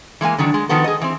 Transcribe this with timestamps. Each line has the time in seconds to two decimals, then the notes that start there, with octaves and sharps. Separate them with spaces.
0.21 E3 G#3 A#3 G#5
0.38 D3 D#3 F#3 D4
0.54 G#3
0.69 D#3 F3 B3 F#4 A4
0.84 G#4 D#5
1.01 E3 C4